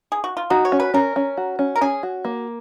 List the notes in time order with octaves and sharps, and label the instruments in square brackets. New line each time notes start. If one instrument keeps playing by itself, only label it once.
[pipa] G#4
F#4
F4
[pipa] D#4 [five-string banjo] F#4
[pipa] C#5
[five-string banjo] C#4
[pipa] B4
[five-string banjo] C#4 [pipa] A#4
[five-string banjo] C#4
F#4
C#4
[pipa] A#4
[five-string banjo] C#4 [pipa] G#4
[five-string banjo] F#4
A#3